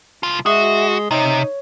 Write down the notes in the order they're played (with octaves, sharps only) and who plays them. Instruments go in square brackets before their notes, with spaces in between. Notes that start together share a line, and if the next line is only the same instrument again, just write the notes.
[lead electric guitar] C2 F4
[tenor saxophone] G#3 [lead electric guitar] F#4 [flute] E5
[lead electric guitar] C3 [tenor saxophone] D#4 [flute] C#5